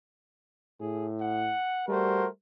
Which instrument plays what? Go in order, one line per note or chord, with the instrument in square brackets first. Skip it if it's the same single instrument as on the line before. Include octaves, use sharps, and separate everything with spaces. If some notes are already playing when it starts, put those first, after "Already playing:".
[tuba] A2 [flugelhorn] G#4
[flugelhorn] F#5
[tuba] G3 [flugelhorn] A3 [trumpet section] F#4 A#4 C5